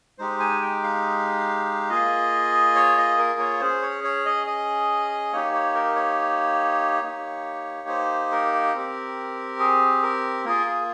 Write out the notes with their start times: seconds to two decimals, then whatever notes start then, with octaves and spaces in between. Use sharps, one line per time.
0.18 G#3 D#4 G4 C5
0.40 G#5
0.62 G5
0.83 F5
1.90 A#3 F4 G#4 D#5
2.75 C#5
2.98 D#5
3.18 A#4
3.40 C#5
3.61 C#4 G#4 C5
3.82 C#5
4.04 C#5
4.26 D#5
4.47 D#5
5.32 A#3 D#4 G4 C#5
5.54 C#5
5.75 A#4
5.96 C#5
7.03 A#3 D#4 G4
7.88 C5
8.32 A#4
8.74 C4 G4
9.59 G#4
10.03 A#4
10.45 A#3 F4 G#4 A#4
10.66 G#4